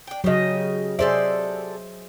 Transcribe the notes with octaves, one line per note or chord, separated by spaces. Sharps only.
D4 G5
C#3 F#3 G4 D#5
C3 G#4 A4 C5 D5 E5